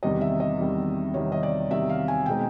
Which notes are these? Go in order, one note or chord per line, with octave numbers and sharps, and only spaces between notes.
E2 C3 D#3 G3 D#5
E5
D#5
E2 C3 D#3 G3
E2 C3 D#3 G3 C#5
D#5
D5
E2 C3 D#3 G3 E5
F5
G#5
B2 G#3 C4 D#4 G5